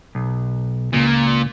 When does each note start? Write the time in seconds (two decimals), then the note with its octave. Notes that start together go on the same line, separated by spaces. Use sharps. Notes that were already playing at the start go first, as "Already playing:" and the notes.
0.15 B1
0.93 C#2 A#2